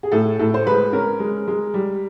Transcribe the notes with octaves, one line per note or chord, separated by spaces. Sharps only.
G#4
A2 A4
A2 A4
C5
G#3 B4
C#4 A#4
G#3
G#3
G3